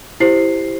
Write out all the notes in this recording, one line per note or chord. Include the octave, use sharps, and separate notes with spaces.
E4 G4 C5 C7